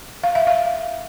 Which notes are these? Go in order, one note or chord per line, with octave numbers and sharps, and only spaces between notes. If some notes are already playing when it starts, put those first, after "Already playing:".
F5
E5
F5